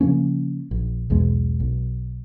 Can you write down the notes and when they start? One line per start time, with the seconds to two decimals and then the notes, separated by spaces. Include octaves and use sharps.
0.01 C#3 F3 A#3 C#4
0.71 A#1
1.10 B1 E2 B2 G#3
1.60 B1